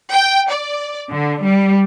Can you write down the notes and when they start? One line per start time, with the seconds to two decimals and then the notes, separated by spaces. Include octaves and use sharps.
0.13 G5
0.51 D5
1.11 D3
1.44 G3